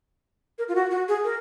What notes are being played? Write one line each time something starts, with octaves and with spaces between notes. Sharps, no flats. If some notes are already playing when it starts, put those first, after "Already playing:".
A#4
F4
F#4
F#4
G#4
A#4